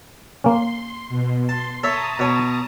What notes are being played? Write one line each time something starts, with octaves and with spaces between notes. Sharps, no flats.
A#3 C#4 C6
B2
A5 C6
A4 C#5 E5 A5 A#5 D#6
B2 C#5